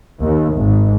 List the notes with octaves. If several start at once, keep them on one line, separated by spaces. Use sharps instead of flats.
D#2
G#1